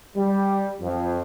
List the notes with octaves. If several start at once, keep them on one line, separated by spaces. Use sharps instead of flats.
G3
F2